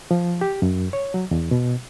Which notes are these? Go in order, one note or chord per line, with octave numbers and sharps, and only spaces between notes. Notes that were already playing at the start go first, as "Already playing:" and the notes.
F3
G4
F#2
C#5
F#3
E2
B2